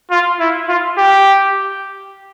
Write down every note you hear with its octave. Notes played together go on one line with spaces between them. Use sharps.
F4
E4
F4
G4